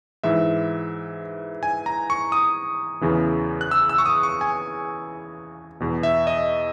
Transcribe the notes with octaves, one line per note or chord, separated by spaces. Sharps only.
G#2 E3 E5
G#5
A#5
C#6
D#6
E2 C#3 E3
F#6
E6
E6
C#6
D#6
C#6
G#5
E2 B2
E5
D#5